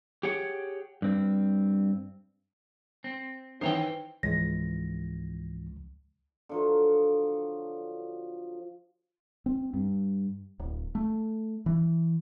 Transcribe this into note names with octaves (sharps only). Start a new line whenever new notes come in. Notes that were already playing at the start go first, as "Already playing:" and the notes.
G4 G#4 C#5 F#5 G5
G2 C4
C4
D#3 E3 C5 C#5 G5
C#2 G#2 E3 F3 A#6
D3 F3 F#3
C4
G2
D1
A3
E3